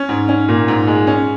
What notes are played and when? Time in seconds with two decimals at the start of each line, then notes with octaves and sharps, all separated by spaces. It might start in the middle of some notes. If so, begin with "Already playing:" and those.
Already playing: C#4
0.09 G#2
0.29 C#4
0.48 A#2
0.68 G#2
0.87 G#3
1.07 C#4